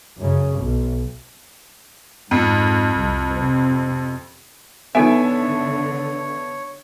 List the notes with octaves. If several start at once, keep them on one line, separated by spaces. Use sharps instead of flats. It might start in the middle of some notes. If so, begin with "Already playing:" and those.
F#2 C#3
B1 B2
F2 G#2
C2
C3 C4
D3 B3 D#4 A4 C#5 E5 G#5